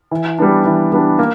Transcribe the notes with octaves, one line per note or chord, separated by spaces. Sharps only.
E3
G3 B3 D4
E3
G3 B3 D4
A#3